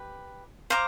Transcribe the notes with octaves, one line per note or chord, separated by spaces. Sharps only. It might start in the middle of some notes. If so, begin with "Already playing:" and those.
Already playing: G4 B4
C5 F5 A#5 D6